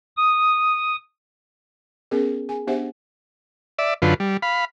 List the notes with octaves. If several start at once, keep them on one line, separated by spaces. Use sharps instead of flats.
D#6
B3 C#4 G#4 A#4
G#4 G#5
B3 D4 G4 C5 E5 F#5
D5 E5
F#2 D3 F4 B4
G3
F5 B5